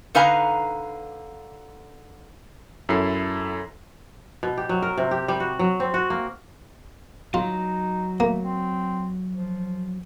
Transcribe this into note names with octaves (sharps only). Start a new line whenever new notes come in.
D3 D#4 B4 F5 G#5 A#5
F#2 F#3 E4 A4 C7
B2
G4
F#3
A#4
C3
G4
G3
F#4
F#3
C4
F#4
A#3
F#3 D#4 F4
A3 A#3
C4
F3